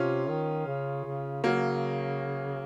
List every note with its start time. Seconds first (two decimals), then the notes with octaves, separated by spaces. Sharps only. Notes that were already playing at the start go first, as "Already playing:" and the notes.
Already playing: C3 C#4 F4
0.29 D#3
0.67 C#3
1.05 C#3
1.44 C#3 F#3 A#3